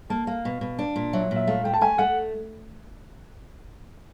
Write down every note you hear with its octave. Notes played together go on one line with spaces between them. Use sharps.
A#3 A5
A#3 F5
B2
B2
D4
A#2
F#3 E5
A#2
E5
A3 F5
A3 G5
A5
A3 G#5
A3 F#5